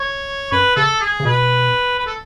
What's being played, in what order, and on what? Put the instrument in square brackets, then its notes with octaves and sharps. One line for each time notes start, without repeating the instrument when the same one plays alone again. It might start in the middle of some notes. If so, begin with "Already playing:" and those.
Already playing: [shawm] C#5
[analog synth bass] F#2 [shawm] B4
[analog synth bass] C#3 [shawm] A4
[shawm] G#4
[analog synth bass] C#3
[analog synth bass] B2 [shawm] B4
[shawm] B4
A4